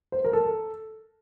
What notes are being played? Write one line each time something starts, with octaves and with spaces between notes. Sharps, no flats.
C5
A#4
A4